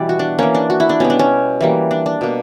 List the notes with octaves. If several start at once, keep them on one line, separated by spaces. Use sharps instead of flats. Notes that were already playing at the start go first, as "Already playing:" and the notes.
Already playing: B2 E3 G3 B3 D5
F#4
D4
E3 A#3 C#4
D4
F#4
E4
D4
B2 G3 B3 C#4
D4
C#4
E3 G3 A#3
D4
D4
B2 A#3